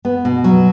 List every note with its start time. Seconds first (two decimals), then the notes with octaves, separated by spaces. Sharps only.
0.05 B3
0.25 B2
0.44 F#3